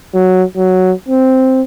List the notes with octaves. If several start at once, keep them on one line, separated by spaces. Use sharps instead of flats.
F#3
F#3
C4